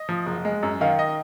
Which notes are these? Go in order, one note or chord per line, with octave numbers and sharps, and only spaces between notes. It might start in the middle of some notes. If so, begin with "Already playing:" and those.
Already playing: D#5
F3
F#1
G#3
F#2
D#3 F5
D#5